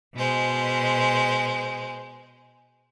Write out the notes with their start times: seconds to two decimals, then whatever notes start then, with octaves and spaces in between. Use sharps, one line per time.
0.14 B2 G#3 C5